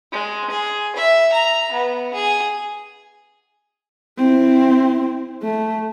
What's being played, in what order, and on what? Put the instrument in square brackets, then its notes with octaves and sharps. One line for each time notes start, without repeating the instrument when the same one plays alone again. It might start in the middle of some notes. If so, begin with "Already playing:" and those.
[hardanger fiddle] G#3
G#4
E5
A#5
B3
G#4
[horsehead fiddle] C4 E4
A3